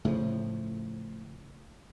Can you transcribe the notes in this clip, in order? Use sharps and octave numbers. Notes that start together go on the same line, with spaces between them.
A2 C#3 F3